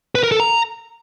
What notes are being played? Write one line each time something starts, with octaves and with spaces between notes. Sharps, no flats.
B4
A#4
A4
A#5